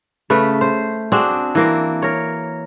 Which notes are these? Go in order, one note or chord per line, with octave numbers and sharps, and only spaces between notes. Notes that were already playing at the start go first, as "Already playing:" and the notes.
C#3 A3 B4
C5
C4 D4 F#4 G#4
E3 A#3 C4
A#4 C#5